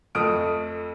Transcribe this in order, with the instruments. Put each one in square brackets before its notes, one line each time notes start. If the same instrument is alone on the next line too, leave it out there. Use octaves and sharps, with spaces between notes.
[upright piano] F2 A3 D#6 F6 D7